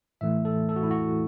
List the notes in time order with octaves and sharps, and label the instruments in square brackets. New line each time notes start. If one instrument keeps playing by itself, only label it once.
[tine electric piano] A2 E3 A3 E5
A4
A4
F#4
E4
F#4